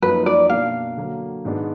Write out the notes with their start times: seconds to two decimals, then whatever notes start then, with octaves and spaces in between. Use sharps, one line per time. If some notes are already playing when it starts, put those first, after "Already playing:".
0.02 F#2 F3 A#3 D#4 B4
0.26 D5
0.49 B2 A#3 D4 F5
0.98 D3 F#3 A#3
1.45 G#2 D#3 G#3 B3 D4